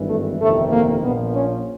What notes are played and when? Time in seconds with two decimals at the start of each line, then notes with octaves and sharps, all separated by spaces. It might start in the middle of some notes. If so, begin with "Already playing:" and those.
Already playing: G#1 G2 E3
0.09 A3
0.41 G1 F2 C3 D#3 A3
0.72 A#3
1.03 A#1 A#2 F3 B3
1.35 C#4